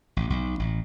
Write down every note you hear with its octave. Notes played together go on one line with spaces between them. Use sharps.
A1
B1
A1